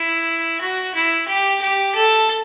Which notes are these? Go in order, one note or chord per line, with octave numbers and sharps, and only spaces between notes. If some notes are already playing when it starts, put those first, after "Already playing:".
Already playing: E4
F#4
E4
G4
G4
A4